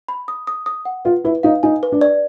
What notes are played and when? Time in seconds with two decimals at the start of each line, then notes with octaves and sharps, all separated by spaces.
0.08 B5
0.28 D#6
0.47 D#6
0.66 D#6
0.85 F#5
1.05 F4 B4
1.24 E4 B4
1.43 D#4 F5
1.63 D#4 G#5
1.83 B4
1.92 D4
2.01 D5